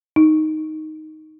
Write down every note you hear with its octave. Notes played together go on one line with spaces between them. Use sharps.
D#4